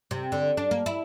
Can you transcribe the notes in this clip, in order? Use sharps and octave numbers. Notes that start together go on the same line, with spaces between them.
C3
D3
D4
A#3
E4